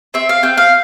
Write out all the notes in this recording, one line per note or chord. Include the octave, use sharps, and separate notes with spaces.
C4 E5
F5
C4 G5
F5